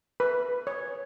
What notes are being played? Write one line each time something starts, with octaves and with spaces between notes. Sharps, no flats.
B4
C#5